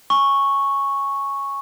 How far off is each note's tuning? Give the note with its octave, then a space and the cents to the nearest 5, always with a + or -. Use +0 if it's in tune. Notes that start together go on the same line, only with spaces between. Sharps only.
G#5 +0 C#6 -5